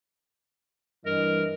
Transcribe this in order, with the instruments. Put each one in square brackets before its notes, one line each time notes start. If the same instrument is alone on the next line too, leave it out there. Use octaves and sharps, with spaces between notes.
[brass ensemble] G2 E3 D#5 [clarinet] A#4